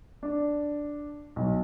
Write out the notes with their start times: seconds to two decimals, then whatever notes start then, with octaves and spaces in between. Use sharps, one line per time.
0.23 D4
1.36 B1